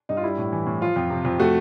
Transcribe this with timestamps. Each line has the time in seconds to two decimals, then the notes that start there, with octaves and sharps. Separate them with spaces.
0.09 G2 D#4
0.17 F4
0.23 G3 E4
0.38 A2
0.52 E3
0.66 A2
0.81 F3 F4
0.96 F2
1.10 C3
1.25 F2
1.39 A3 F#4